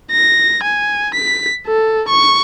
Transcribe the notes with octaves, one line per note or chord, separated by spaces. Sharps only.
A#6
G#5
B6
A4
C#6